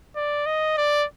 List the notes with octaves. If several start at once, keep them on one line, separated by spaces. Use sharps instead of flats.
D5
D#5
D5